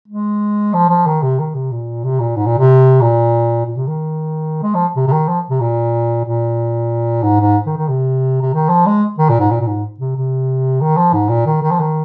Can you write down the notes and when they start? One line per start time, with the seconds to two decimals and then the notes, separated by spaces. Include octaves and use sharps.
0.08 G#3
0.74 F3
0.90 F3
1.07 D#3
1.23 C3
1.39 D#3
1.55 C3
1.72 A#2
2.04 C3
2.20 A#2
2.36 G#2
2.46 A#2
2.58 C3
3.01 A#2
3.66 A#2
3.77 C3
3.87 D#3
4.63 G#3
4.75 F3
4.96 C3
5.08 C3
5.12 D#3
5.28 F3
5.50 C3
5.61 A#2
6.25 A#2
7.23 G#2
7.40 G#2
7.66 D#3
7.77 D#3
7.88 C3
8.42 C3
8.54 D#3
8.69 F3
8.86 G#3
9.18 D#3
9.29 A#2
9.40 G#2
9.51 A#2
9.61 A#2
9.67 G#2
10.00 C3
10.17 C3
10.81 D#3
10.97 F3
11.14 G#2
11.29 A#2
11.46 D#3
11.63 D#3
11.71 F3
11.80 D#3